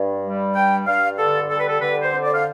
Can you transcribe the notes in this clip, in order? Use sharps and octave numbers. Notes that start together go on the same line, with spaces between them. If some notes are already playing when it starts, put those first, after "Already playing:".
Already playing: G2
G3
G2 G5
G2 F5
D3 A4
G3 A4
B4
A4
D3 B4
C5
F2
D5
F5